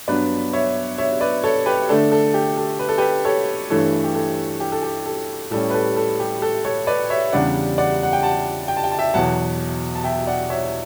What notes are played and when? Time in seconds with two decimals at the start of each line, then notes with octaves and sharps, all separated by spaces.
0.08 G2 F#3 B3 D4 B4 D5
0.53 C#5 E5
0.98 C#5 E5
1.21 B4 D5
1.44 A4 C#5
1.66 G4 B4
1.89 D3 A3 D4 A4
2.12 A4
2.34 G4
2.57 A4
2.79 B4
2.89 A4
2.98 G4 B4
3.25 A4 C#5
3.70 G2 E3 A3 A4 C#5
4.04 G4
4.15 A4
4.60 G4
4.72 A4
4.83 G4
5.06 A4
5.51 A2 G3 C#4 A4
5.70 B4
5.74 A4
5.97 A4
6.20 G4
6.42 A4
6.65 A4 C#5
6.87 B4 D5
7.10 C#5 E5
7.32 E2 C#3 G3 D4 D5 F#5
7.78 D5 F#5
8.03 F#5
8.13 G5
8.23 F#5 A5
8.68 G5
8.77 A5
8.84 G5
8.92 A5
8.99 E5 G5
9.14 E2 B2 F#3 F#5 A5
9.95 A5
10.04 E5 G5
10.27 D5 F#5
10.50 C#5 E5